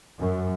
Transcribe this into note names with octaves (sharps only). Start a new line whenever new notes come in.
F#2